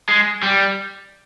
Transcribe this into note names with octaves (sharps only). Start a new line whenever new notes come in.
G#3
G3